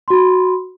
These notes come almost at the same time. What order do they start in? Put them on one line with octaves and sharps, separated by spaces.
C6 F#4 B5